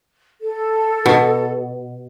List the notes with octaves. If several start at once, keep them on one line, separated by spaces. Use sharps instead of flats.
A4
B2